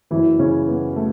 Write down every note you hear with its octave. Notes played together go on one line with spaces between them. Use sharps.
F#1 F#2 E3 E4
C#3 C#4
B3
A3